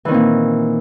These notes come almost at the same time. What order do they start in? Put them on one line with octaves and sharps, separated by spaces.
E3 D#3 C4 A#2